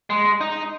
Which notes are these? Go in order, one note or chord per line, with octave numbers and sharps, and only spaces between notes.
G#3
D#4